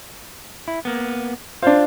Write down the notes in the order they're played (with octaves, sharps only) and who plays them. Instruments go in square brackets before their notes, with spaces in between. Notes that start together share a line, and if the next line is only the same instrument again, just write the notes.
[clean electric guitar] E4
A#3 B3
[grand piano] D4 C5 [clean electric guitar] F4 F5